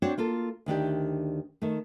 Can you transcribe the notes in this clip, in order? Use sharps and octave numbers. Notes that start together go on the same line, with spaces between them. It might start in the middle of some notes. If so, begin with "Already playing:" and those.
C4 D4 F#4 C5 C#5
A#3 F4 A4
D2 D#3 D4 G4
D#3 A3